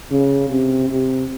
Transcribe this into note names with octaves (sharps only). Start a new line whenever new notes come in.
C#3
C3
C3